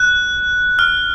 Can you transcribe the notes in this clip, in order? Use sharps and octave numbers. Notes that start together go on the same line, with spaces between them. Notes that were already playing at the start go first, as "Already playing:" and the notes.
Already playing: F#6
F6